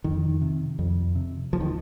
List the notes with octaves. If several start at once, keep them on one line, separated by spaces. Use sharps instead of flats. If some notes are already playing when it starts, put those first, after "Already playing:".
F2 D#3
C3
F2
C3
D#2 F3
D#3